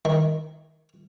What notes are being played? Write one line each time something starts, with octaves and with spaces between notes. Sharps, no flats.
D#3